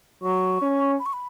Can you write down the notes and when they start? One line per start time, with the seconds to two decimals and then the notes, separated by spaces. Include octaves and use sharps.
0.23 F#3 C#6
0.62 C#4
1.00 B5
1.06 C#6
1.13 B5